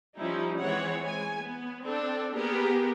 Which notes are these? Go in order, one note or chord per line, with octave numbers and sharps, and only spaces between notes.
F3 G3 C#4 D#4 E4
E3 G#3 C4 C#5 F#5
G#3 G#5
B3
C4 D4 A4
A#3 B3 G4 G#4 A#4